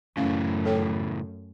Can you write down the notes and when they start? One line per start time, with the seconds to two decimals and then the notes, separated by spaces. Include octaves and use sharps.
0.17 F#2 A2 C#3 E3 A3 C#4 F5
0.66 A4 C#5 G5